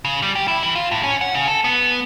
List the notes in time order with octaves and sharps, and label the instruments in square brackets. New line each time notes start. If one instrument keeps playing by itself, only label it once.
[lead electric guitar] C#3
G3
G4
E4
E3
F4
A2
C#4
F#5
C#3
A4
B3